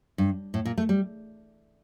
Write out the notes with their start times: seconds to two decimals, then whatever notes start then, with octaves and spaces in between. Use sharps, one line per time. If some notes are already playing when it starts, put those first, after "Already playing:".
0.18 G2
0.54 A2
0.65 A#2
0.78 A3
0.89 G3